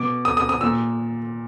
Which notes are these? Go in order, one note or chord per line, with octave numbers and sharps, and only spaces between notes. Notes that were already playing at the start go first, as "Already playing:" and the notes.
Already playing: B2 D6
D#6
D#6
D#6
A#2 E6